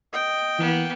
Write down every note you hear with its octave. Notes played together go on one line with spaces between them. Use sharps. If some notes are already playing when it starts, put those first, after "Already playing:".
D#5 G5
E3 A#3 B3